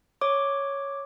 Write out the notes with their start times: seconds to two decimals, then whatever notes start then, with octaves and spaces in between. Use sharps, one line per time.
0.21 C#5 D6